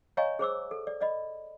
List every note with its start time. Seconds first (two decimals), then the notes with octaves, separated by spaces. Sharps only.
0.17 C#5 D#5 F5 G#5 A#5 C#6
0.39 G#4 C5 D6 E6
0.71 A4
0.87 D5
1.01 D5 D#5 B5